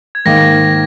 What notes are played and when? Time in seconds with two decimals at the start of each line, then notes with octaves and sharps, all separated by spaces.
0.15 G#6
0.25 G#2 D#3 A#3 A#6